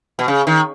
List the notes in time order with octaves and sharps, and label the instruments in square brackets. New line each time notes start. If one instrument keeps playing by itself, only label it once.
[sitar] B2
C#3
D#3